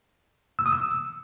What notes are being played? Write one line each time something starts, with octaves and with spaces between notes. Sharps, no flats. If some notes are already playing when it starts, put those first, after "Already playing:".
E6
D#6
E6